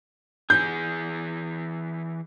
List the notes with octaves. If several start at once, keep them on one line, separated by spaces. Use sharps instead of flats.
E3 G#4 G6